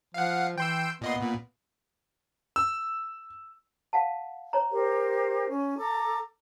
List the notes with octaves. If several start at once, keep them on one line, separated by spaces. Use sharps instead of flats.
F3 F5 F#5
E3 G5 C6 E6
A#2 B3 D#5 C6
A#2
E6
F5 F#5 A5
C#5 A#5
G4 A#4 C5
C#4
A4 A#5 D6